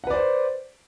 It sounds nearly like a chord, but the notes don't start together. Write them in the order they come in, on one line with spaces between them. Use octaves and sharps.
F#5 B4 D5 C5